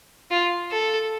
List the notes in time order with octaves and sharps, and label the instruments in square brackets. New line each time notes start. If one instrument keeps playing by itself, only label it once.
[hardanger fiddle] F4
A4